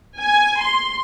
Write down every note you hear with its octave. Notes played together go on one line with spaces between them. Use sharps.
G#5
C6